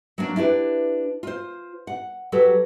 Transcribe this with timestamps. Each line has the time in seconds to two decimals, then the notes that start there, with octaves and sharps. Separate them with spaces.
0.18 F#3 A#3 D4
0.36 D4 E4 G4 B4
1.23 F4 C5
1.87 F#5
2.32 F#3 G4 A4 B4